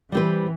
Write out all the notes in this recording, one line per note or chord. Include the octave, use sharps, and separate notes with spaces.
E3 G3 C4 G4 B4